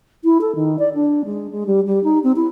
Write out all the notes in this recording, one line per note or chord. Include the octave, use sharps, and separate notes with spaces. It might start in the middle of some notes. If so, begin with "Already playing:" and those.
E4
A4
D#3
D5
D4
G#3
G#3
G3
G3
D#4
C4
E4